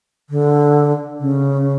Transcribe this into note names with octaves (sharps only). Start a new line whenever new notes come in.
D3
C#3